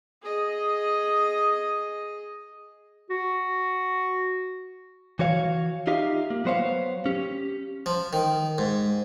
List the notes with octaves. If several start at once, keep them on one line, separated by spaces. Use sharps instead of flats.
G#4 D#5
F#4
E3 F#4 C#5 F5
D#4 F4 G4 E5 F5
A#3
F#3 B3 C5 C#5 F5
C#4 G4
F3
D#3
G#2